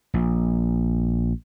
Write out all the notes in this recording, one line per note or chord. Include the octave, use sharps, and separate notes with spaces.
A#1